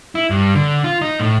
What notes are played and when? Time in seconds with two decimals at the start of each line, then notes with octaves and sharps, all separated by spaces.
0.15 E4
0.30 G2
0.55 D3
0.84 F4
1.02 D#4
1.20 A2